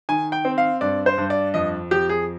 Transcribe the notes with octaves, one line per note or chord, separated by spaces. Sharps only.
D#3 G#5
G5
C4
F5
G2 D5
C5
G2
D5
F2 D#5
F2 G4
G#4